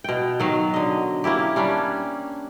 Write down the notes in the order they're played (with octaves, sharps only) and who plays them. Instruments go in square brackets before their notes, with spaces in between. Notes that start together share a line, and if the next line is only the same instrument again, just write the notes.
[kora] B2 G5
D#3 F#3 F5
D3 D#5
A#3 C#4 E4 G4
G3 C#4 D4